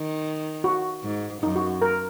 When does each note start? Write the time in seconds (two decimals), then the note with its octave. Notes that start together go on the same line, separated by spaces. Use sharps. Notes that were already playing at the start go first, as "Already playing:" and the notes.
Already playing: D#3
0.64 F#4
1.03 G#2
1.42 F#2 D#4
1.56 F#4
1.82 A#4